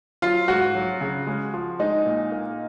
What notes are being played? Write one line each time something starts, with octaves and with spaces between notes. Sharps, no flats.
F#3 F4
G#2 F#4
F#3
C#3
G#3
F3
G#3 D#4
A#2
A#3